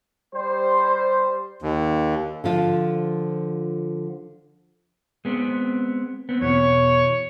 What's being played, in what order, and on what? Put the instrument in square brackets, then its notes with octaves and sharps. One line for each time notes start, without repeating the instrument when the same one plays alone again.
[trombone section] G3 C5
[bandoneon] D#2
[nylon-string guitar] D3 F3 F4
[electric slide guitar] G#3 B3 C4
B3 C4
[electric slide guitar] E2 B2 [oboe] C#5